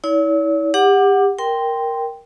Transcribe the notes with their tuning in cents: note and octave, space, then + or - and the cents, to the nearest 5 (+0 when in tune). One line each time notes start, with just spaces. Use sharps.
E4 -35 C#5 +45
G4 +30 F#5 +0 D6 +15
A#4 +0 G5 +0 C6 -5